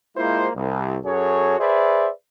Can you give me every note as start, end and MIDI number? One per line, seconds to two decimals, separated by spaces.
0.17 0.48 56
0.17 0.48 58
0.17 0.48 64
0.17 0.48 65
0.17 0.48 72
0.55 0.98 36
1.05 1.59 42
1.05 1.59 66
1.05 1.59 68
1.05 1.59 69
1.05 1.59 73
1.59 2.10 68
1.59 2.10 71
1.59 2.10 72
1.59 2.10 74
1.59 2.10 76